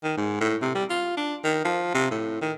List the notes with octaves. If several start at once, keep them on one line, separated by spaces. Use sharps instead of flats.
D#3
G#2
A2
C3
G3
F4
D4
D#3
F3
C3
A2
D#3